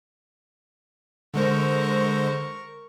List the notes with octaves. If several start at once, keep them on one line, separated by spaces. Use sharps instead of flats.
D3 G#3 A#4 C5 C#6